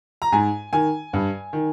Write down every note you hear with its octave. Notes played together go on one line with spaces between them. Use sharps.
A#5
G#2 G#5
D#3 G#5
G2
D#3